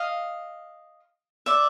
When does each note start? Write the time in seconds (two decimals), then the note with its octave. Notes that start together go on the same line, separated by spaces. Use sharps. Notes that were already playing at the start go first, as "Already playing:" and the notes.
Already playing: D#5 F5
1.46 D5 E5